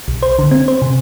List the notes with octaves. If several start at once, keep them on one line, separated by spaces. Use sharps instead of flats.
B1
C5
D3
C4
C5
C3